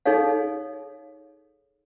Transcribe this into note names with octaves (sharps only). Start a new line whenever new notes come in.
D#4 G#4 A4 C#5 F5